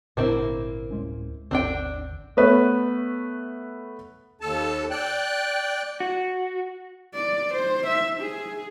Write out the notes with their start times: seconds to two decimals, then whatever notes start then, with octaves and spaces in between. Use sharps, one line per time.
0.17 G#1 A#2 D3 A#3 C4 E4
0.91 D1 G#3 C#4
1.51 G#1 D#2 D3 C4 D4 G5
2.37 A3 B3 B4 C#5
4.41 D#2 A4 A5
4.91 D5 G5 F#6
6.00 F#4
7.14 D5
7.55 C5
7.87 E5
8.20 G#4